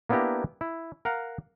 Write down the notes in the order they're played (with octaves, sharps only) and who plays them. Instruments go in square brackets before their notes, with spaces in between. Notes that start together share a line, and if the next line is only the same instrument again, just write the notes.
[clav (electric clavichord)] A#3 B3 D4 E4 G4 A#5
E4
A#4 F5 F#5 A#5